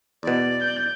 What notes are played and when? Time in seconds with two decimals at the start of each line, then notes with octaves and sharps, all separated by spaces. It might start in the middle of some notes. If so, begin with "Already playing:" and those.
0.23 E2 B2 D5
0.61 G6